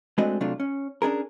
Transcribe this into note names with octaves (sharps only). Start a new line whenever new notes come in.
G#3 A3 C4 D4 F#4 D#5
C3 F#3 A3 D4 F4
C#4
C#4 D4 G#4 A#4